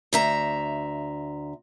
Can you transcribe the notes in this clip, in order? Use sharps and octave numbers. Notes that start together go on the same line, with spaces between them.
D2 E5 A#5